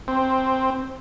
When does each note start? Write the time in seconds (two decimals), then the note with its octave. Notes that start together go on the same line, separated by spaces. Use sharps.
0.08 C4